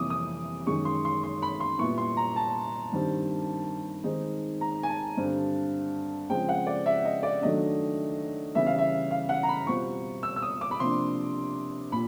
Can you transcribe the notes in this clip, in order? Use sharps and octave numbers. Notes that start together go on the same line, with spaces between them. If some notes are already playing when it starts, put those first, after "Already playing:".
Already playing: F2 C3 E3 G3 A#3 D6 D#6
D#6
F#2 D#3 G#3 C#6
C6
C6
C6
B5
C6
A#2 G3 B3 E4 C#6
C6
A#5
A5
G2 D#3 G3 C4
D#3 G#3 C4 D#4
A#5
G#5
A5
G2 D3 G3 C4
C#3 F3 G#3 C4 G5
F#5
D5
E5
D#5
D5
D#3 F#3 A3 D4 D#5
C#3 E3 G3 B3 E5
F5
E5
F5
F#5
A#5
B5
B2 G3 C4 F4 C#6
E6
E6
D#6
D6
B5
C3 F3 A#3 D4 C6
A#2 B5